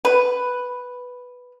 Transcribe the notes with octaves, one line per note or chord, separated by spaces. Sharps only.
B4